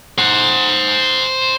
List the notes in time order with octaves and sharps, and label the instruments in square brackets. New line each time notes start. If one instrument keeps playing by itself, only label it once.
[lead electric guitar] C5 F#5